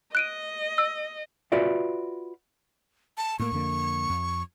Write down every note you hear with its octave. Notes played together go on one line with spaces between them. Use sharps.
D#5 F#6 D7 D#7
E6
F4 F#4 B4 D5 E5
A5
A2 A#3 C#6
F2 D3 A#3
F2